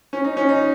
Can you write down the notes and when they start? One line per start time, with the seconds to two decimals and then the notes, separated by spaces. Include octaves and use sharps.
0.13 C#4
0.24 D#4
0.37 C#4
0.49 D#4